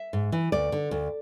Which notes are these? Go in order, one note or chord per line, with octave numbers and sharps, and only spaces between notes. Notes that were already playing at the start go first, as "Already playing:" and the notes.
Already playing: E5
G#2
E3
D2 D5
D3
D2